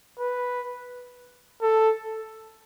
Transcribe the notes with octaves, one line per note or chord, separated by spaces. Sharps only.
B4
A4